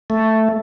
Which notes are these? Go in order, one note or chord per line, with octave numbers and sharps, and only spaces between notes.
A3